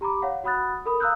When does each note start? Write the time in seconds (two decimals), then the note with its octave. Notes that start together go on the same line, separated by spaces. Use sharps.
0.01 G4 A#5 B5 D6
0.22 C#5 F5 F#5
0.44 F#4 F#5 B5 D#6 F#6 A6
0.86 A4 A#4 B5 D#6
1.00 F5 A#5 D#6 E6 F#6 G6